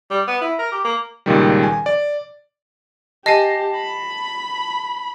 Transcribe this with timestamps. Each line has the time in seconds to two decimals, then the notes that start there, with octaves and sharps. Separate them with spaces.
0.10 G3
0.28 B3
0.41 E4
0.59 A#4
0.72 G4
0.84 A#3
1.26 C#2 A#2 D#3 G3
1.63 G#5
1.86 D5
3.26 G4 D#5 G#5 A5 A#6 C7
3.76 B5